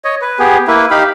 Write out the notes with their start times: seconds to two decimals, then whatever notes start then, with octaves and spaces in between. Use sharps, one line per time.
0.04 C#5 D#5
0.22 B4
0.39 B3 G4 G#4
0.68 A#3 E4 B4
0.91 D#4 G4 F5 B5